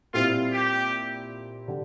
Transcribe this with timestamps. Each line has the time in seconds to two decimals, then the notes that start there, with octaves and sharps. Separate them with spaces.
0.13 A#2 G3 C4 E4 F4
0.52 G4
1.68 D3 G3 D4